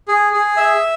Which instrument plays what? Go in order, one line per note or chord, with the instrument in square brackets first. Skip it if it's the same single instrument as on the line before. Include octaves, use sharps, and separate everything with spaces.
[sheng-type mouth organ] G#4
G#4
E5